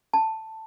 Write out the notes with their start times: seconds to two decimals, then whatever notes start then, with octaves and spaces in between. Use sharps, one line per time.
0.13 A5